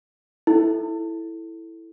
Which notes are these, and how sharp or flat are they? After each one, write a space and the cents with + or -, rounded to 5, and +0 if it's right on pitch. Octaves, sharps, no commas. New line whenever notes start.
E4 +0 A4 +0